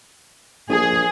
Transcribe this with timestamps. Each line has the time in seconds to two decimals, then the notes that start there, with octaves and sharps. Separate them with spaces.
0.70 A#1 G#4